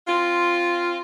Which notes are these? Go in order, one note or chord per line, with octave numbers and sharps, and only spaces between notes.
C4 F4